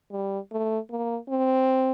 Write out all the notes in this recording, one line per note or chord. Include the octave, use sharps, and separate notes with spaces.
G3
A3
A#3
C4